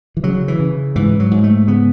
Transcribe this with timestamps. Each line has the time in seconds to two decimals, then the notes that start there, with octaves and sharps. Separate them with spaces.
0.17 E3
0.24 C#3 F#3
0.48 E3
0.60 C#3
0.96 G#2 E3
1.20 F#3
1.31 G#2
1.44 A3
1.67 C#3 B3